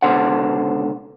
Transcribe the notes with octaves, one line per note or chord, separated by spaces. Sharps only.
C#2 B2 D3 C5 F#5